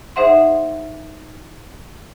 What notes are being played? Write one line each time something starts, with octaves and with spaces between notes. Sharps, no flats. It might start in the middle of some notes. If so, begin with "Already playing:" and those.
D#4 G#4 C5 E5 F#5 C6